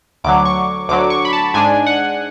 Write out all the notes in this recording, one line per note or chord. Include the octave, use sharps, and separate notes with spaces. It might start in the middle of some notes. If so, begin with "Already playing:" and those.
D2 D3 F#3 D6
C#6
D2 D3 F#3 D6
C#6
B5
A5
G#2 G#3 D4 G#5
F#5